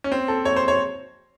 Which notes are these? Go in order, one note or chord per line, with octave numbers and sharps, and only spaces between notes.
C#4
C4
A4
C#5
C5
C#5